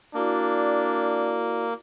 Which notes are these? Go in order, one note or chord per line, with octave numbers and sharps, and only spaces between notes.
A#3 D4 E4 F#4 D5